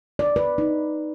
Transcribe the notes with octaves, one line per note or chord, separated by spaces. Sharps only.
D5
B4
D#4